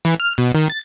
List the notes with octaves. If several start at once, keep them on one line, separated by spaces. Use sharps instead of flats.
E3
F6
B2
D#3
A6